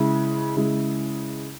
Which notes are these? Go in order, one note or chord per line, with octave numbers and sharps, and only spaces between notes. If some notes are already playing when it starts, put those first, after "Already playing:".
Already playing: C#3 G#3 E4
C#3 G#3 E4